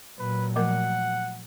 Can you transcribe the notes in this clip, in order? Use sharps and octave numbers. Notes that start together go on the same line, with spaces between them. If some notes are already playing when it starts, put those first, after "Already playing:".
A#2 F#3 B4
F3 A3 A#4 F#5